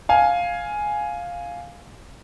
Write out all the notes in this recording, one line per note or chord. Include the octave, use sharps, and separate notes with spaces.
F5 G#5